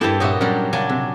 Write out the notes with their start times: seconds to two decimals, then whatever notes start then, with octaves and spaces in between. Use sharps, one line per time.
0.01 G2 A#3 E4 G4 A4 E5
0.20 A#2 F#4 C#5 D#5 E5
0.41 F#3 G3 C#4 D4 A#4
0.73 C#3 F#3 D4 G#5
0.89 C3